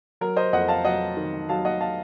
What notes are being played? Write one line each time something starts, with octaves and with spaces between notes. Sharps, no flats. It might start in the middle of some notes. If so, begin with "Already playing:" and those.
F#3 A#4
C5 D#5
F2 D#5 F#5
F5 A5
F#3 D#5 F#5
D#3
F#3 F5 A5
D#5 F#5
F5 A5